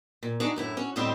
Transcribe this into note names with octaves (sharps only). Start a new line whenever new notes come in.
A#2
D4 D#4 F#4 G#4
F#2 A2 E4
C#4 F#4
D2 A2 G3 C4 C5 D#5